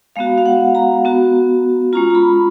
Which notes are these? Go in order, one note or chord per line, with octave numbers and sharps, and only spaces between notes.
G#3 B3 F#4 F5
F5
F#5
A#5
B3 F#4
G#3 C#4 F4 A#5
A#5
B5